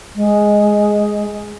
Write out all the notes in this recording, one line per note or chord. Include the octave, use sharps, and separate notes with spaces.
G#3